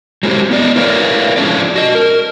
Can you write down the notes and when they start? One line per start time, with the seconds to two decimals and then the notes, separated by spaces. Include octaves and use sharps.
0.23 F#3 G#3 C4 E4 G4
0.51 B3 D5 D#5
0.76 E4 A#4 B4 C#5 D5 F5
1.36 F3 G#3 C#4 D4 C5 D5
1.76 F#4 D#5
1.95 A#4